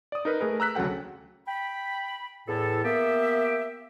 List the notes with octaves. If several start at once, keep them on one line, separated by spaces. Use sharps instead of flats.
D5 D#6
D#4 A#4 B4
A3 G#4 A#4 B4
A#5 E6 F#6 B6
D2 C#3 F#3 A4 F#5 G5
G5 B5
E2 A2 A4
A#3 B3 G4 E5